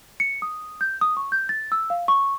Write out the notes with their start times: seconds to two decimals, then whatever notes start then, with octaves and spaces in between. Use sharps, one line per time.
0.20 C#7
0.42 D#6
0.81 G6
1.01 D#6
1.17 C#6
1.32 G6
1.49 A6
1.72 E6
1.90 F5
2.08 C#6